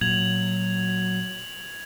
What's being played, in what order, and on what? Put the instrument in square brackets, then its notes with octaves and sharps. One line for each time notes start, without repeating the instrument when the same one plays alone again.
[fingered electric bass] A#2 [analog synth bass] F#3 [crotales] G#6 F7 F#7